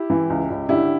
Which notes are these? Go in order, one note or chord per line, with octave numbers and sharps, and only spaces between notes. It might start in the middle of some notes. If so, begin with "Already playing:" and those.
Already playing: E4 G4
E3
C#2
C#2
D3 E4 G4